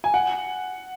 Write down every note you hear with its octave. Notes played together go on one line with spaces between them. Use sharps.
G#5
F#5